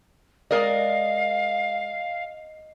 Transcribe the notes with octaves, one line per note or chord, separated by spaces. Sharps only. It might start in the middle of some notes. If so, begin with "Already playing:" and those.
G#3 A#4 D5 D#5 F5